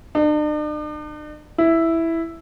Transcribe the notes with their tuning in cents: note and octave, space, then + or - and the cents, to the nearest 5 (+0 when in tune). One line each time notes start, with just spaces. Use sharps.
D4 +45
E4 +0